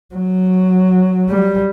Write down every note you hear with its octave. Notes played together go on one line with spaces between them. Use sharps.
F#3
G3